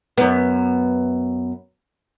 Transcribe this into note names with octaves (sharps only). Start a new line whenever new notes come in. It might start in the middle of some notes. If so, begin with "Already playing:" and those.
F#2 B3